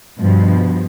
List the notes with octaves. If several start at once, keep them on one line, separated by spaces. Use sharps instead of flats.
G2 B2 F3